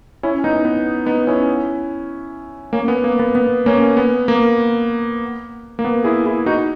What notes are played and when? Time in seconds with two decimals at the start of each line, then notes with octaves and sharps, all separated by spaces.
0.23 C#4 E4
0.44 B3 D#4
0.65 B3
1.06 B3 D#4
1.27 C#4 E4
2.73 A#3 C#4
2.88 B3
3.04 A#3
3.19 B3
3.35 B3
3.66 A#3 C#4
3.97 B3
4.28 A#3
5.79 A#3
5.85 B3
6.04 E4 G#4
6.25 E4 G#4
6.46 D#4 F#4